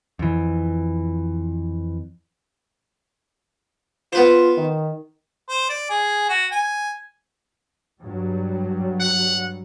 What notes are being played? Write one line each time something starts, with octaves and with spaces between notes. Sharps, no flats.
F2 E3
B3 F4 B4 C5
D#3
C5
D5
G#4
F#4
G#5
G2 F#3 G3
F#5